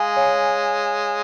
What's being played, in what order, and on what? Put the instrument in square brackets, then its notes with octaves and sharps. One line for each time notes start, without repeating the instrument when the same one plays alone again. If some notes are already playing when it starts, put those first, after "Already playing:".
Already playing: [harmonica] G#3 [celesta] F5 G#5
[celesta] C#5 F5